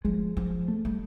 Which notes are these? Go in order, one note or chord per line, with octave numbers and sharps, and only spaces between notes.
F3 G#3
F3
A3
G3